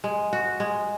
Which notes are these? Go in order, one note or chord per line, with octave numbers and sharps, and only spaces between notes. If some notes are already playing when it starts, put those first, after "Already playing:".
G#3
F#4
G#3